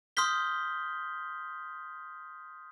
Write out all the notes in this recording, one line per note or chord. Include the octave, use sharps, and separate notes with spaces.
C6 D#6 F6 G6 B6 G7